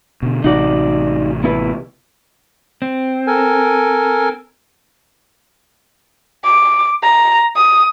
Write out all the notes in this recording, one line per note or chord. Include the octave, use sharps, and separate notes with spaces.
B2 D3
A1 C3 D#4 F#4 D5
B3 E4 B4
C4
A4 A#4 G#5
D6
A#5
D#6